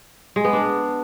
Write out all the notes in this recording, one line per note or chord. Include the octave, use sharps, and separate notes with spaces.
G#3
B3
D4